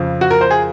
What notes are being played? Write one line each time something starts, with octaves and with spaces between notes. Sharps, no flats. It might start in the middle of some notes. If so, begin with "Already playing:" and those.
Already playing: F2 C#3 F3
F#4
A#4
C5
G#4